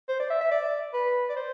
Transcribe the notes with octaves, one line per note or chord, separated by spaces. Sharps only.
C5
D5
E5
E5
D5
B4
D5
C5